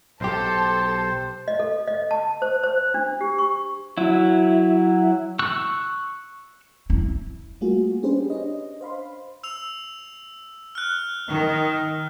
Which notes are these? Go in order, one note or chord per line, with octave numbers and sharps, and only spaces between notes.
B1 G4 A4 C5 A5 C6
D#5
A4
D#5
A5
C5
C5
D4
G4
C#6
F#3 E4
C#6 E6 F#6
E4
G3 A3 A#3 F4 F#4 G#4
C#4 D4 G4 G#4 B4 C5
D4 C#5 D#5
C5 F5 B5 C6
E6 F7
F6 F#6
D#3